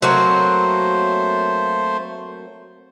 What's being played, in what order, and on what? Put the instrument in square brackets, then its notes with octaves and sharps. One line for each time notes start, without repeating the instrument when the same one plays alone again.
[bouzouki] F#3 A#3 C4 [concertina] A3 C5